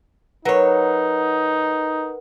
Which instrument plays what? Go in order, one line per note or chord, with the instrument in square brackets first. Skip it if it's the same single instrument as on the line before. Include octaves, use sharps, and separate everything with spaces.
[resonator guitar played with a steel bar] F#3 C#5 [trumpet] D#4 [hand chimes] A#4 B4 F#5